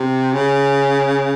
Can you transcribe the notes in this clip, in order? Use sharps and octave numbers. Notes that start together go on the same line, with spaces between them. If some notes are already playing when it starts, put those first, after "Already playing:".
Already playing: C3
C#3